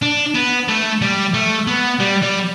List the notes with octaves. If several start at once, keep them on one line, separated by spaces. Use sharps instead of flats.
D4
B3
A3
G3
A3
B3
G3
G3